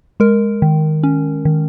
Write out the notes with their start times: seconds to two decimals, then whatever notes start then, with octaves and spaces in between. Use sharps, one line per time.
0.20 G#3 A#4
0.62 D#3
1.03 C#4
1.45 D#3